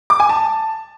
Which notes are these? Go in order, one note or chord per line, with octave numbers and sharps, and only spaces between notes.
D6
G#5
A5